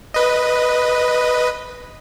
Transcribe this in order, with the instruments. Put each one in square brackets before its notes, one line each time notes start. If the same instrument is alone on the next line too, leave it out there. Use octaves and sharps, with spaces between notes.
[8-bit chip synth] B4 D#5